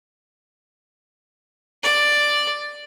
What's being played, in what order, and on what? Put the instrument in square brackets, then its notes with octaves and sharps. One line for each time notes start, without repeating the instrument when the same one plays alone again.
[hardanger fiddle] D5